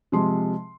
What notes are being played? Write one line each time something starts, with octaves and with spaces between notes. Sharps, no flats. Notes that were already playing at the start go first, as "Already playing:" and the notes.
C3 F3 G#3 C6